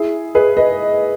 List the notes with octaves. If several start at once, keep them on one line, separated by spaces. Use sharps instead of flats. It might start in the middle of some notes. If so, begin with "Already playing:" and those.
Already playing: E4 G#4
G#4 B4
B4 D#5